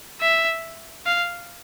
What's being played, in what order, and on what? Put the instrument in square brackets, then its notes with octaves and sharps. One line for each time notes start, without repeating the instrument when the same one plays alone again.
[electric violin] E5
F5